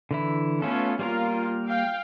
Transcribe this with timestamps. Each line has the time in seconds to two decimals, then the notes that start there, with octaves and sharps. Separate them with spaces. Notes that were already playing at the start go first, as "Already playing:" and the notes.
0.11 D3 E3 E4
0.62 A3 B3 C#4 F4 A4
0.99 G3 A#3 F4 A#4
1.67 F5 G5